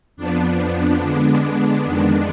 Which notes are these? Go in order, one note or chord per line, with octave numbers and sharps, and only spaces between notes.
F2 F3 B3 D4
D3 G#3 B3
F2 D#3 G#3 B3 D4